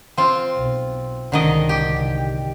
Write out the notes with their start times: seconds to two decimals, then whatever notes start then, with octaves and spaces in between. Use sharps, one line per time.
0.17 C4 F4
0.57 B1
1.32 C2 G#2 D3 D#3 D#5
1.69 G4